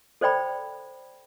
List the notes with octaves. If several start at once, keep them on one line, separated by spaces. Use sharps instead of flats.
A4 C5 D5 G5 B5